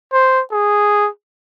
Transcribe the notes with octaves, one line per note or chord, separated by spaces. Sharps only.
C5
G#4